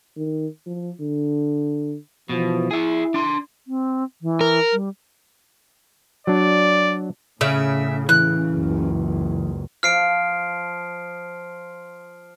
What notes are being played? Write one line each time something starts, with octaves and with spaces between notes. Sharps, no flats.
D#3
F3
D3
B2 E3 F3
E4 G#4 E5
D4 C6
C4
E3
A#4
G3
F#3 D4 D5
A2 C#3 E5
E3 F#6
F#1 C#2
F3 F6 C7 D7